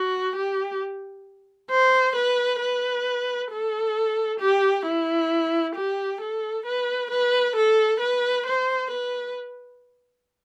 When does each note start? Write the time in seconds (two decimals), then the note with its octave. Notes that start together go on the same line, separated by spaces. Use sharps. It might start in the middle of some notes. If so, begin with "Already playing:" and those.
Already playing: F#4
0.35 G4
1.70 C5
2.15 B4
2.60 B4
3.51 A4
4.40 G4
4.85 E4
5.75 G4
6.21 A4
6.66 B4
7.10 B4
7.56 A4
8.00 B4
8.46 C5
8.90 B4